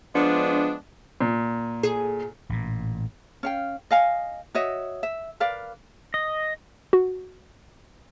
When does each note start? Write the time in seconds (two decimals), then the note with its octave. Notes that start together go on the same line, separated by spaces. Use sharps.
0.15 F3 G#3 B3 D4
1.21 A#2
1.83 G#4
2.49 A1 A#2
3.43 C#4 F5 G5
3.91 D#5 F5 G#5
4.54 F#4 C#5 D#5 E5
5.03 E5
5.40 A#4 B4 D5 F5
6.14 D#5
6.93 F#4